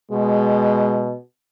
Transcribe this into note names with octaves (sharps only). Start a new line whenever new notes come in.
B2 G#3